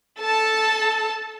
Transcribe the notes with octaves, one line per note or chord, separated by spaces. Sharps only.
A4 A5